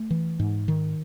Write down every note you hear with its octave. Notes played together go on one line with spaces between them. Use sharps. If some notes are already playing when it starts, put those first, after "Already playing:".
Already playing: A3
E3
G#2
D#3